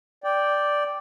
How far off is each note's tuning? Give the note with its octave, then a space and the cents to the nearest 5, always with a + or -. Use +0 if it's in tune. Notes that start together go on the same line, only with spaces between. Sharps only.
D5 +0 G5 +0